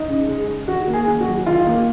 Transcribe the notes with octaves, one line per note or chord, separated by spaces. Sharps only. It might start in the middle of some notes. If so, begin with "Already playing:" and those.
Already playing: D#4
C#3
G#3
G#3
D#3 F#4
A#3
G#4
D#3
F#4
F#3
D#3 F4
A#3